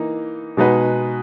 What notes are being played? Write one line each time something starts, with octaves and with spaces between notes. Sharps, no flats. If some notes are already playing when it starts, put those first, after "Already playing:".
Already playing: E3 A#3 D#4
B2 G#3 D#4 F#4 B4